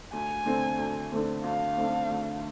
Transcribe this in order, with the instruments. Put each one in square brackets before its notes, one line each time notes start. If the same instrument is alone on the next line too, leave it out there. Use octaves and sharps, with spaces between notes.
[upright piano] D2 [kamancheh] G#5
[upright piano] D3 A3 C4
D2
D3 A3 C4
[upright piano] D2 [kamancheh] F5
[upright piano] D3 A3 C4
D2